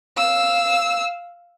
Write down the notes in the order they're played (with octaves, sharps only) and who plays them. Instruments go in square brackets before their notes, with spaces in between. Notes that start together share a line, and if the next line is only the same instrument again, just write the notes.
[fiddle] F5 E6